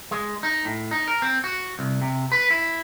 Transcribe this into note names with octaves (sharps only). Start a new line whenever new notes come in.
G#3
D#4
A2
D#4
A#4
C4
F#4
C2
C3
B4
E4